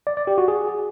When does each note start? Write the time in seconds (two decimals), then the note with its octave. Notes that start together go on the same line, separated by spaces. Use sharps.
0.07 D5
0.17 D5
0.27 G4
0.38 F#4
0.48 G#4